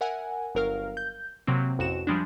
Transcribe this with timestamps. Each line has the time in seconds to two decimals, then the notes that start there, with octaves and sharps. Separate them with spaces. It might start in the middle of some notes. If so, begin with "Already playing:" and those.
0.01 A#4 E5 F#5 G#5
0.55 G1 F#3 A#4 F5 F6
0.97 G6
1.47 C3 F#3 A#3 C4
1.78 A1 F2 F#4 E7
2.07 F3 G3 G#3 D4